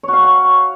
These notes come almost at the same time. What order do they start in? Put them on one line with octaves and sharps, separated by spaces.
C#5 F#4 F5